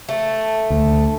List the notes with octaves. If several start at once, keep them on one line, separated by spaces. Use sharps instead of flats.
A3
D2